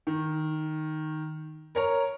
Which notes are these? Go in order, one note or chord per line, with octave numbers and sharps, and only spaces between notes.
D#3
A#4 C#5 A#5